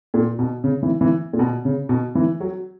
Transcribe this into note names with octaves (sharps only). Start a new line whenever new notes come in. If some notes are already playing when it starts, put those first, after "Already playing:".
A#2
B2
C#3
E3
E3
A#2
B2
C#3
B2
E3
F#3